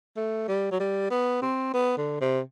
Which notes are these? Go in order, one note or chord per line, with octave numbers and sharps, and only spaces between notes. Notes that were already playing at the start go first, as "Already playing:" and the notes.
A3
G3
F#3
G3
B3
C4
B3
D3
C3